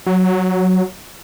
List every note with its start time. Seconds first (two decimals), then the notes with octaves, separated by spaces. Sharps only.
0.06 F#3